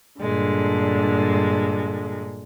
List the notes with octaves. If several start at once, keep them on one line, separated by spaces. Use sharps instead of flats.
G2 A#2 D3 G#3